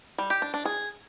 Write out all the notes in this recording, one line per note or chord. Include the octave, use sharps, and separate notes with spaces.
G3
G4
D4
D4
G#4